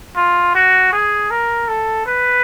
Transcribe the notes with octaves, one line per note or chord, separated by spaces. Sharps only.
F4
F#4
G#4
A#4
A4
B4